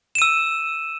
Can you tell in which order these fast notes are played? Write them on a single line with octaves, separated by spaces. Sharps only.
E7 D#7 E6